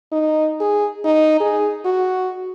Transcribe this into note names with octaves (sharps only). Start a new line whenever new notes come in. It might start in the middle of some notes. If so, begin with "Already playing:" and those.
D#4
G#4
D#4
G#4
F#4